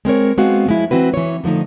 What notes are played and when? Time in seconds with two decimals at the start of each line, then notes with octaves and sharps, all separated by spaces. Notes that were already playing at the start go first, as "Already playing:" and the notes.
0.05 G#3 C4 A#4 C#5
0.38 G#3 B3 C4 F#4 F5
0.66 F3 G#3 E4
0.91 E3 C4 F#4 B4
1.14 E3 C#5
1.44 D3 F3 A3 D#4